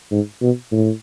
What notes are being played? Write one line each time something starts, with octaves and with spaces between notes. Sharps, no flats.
G#2
B2
A2